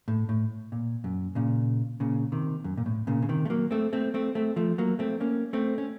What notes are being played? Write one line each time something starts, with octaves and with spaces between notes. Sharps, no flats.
A2
A2
A#2
F#2
A#2 C#3
A#2 C#3
C3 D#3
F#2
A#2
A2
A#2 C#3
C#3
C3 D#3
A3
F#3 A#3
A3 C4
A3 C4
A3 C4
A3 C4
F3 A3
F#3 A#3
A3 C4
A#3 C#4
A3 C4
C#4